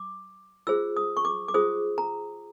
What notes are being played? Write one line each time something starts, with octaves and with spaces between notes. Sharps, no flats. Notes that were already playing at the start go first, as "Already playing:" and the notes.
Already playing: D6
F4 G#4 C5 E6
D#6
C#6
D6
D6
F4 G#4 C5 D#6
A#5